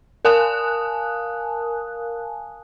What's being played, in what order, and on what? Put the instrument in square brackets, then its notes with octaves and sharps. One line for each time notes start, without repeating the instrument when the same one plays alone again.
[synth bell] A#4 F5 G#5 A5 D#6 F#6